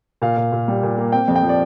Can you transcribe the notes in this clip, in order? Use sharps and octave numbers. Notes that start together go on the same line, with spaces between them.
A#2 F5
A#2
A#2
G3
A#2
A#3
C4 G5
F2
G5
F3
D5